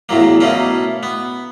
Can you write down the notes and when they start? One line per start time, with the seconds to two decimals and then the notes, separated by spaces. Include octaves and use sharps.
0.09 E2 A2 F#3 A#3
0.40 B2 A3 A#3 C#4
1.03 B3